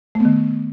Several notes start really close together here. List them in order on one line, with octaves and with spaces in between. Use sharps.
A3 B3 D#3